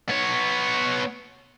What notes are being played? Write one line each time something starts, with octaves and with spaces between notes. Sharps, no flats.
B3 C#5